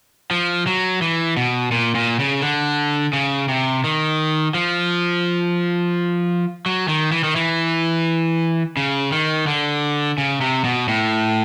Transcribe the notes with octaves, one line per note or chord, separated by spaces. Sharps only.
F3
F#3
E3
B2
A#2
A#2
C#3
D3
C#3
C3
D#3
F3
F#3
D#3
E3
D#3
E3
C#3
D#3
D3
C#3
C3
B2
A2